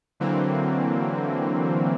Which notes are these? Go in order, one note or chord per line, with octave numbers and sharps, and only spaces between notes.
D3 E3 F#3 A#3 C4